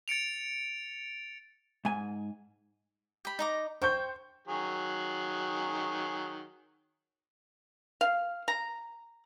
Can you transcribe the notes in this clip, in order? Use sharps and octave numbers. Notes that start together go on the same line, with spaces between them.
A6 C#7 D7 F7
G#2 G#5
G4 B5
D#4 A#5 D6
C5 G5 C#6 G6
D#3 F#3 G#4
F5
A#5